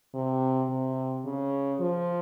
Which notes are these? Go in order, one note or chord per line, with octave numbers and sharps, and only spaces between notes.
C3
C3
C#3
F3